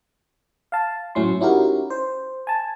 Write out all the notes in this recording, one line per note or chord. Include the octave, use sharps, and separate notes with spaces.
F5 A5
A2 F#3 C#4 E4 C6
C#4 D#4 E4 F#4 G4 A#4
C5
G#5 A5